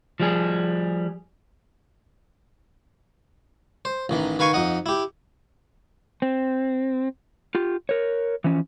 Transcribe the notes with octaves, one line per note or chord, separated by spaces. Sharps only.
F3 G3 G#4
C5
A1 D#3 E3
D#3 B4 F5 G#5 C#6
F2 D#4 D#5 F#5
E4 G4
C4
F4 G4
A#4 C#5
E3 F3 C#4